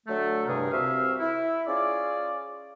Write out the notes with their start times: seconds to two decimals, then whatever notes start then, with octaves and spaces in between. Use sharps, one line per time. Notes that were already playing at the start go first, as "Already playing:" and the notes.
0.07 D3 F#3 A3
0.47 E2 G2 C3 G#4 A#4
0.71 C2 C3 F#4 E5 F5
1.20 E4
1.67 C#4 F4 G#4 D5